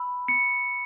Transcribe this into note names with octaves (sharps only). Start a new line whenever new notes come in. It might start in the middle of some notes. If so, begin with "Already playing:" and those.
Already playing: B5 E6
C#7